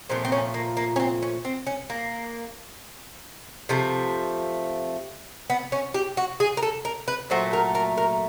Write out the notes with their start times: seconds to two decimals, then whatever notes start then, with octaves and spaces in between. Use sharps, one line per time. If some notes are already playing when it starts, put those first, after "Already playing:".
0.09 A#2 F3 A3 C4
0.25 C4
0.32 C#4
0.54 A#3
0.77 A#3
0.96 C#4
1.00 C4
1.22 C#4
1.45 C4
1.67 C#4
1.90 A#3
3.69 C3 F3 A3
5.50 B3
5.72 C#4
5.94 G4
6.17 F#4
6.40 G#4
6.57 A#4
6.62 A4
6.85 A#4
7.08 B4
7.30 A#2 F#3 A3 C5
7.53 A#4
7.75 A#4
7.98 A#4